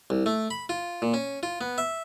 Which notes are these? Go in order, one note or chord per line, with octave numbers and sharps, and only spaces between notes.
C2
A3
B5
F4
A#2
C#4
F4
B3
E5